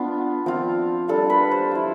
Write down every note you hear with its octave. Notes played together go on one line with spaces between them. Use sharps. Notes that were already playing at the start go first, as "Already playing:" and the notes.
Already playing: B3 D4 F4
F3 C4 F4
G3 D4 F4 A4
B4
C5
F3 A3 E4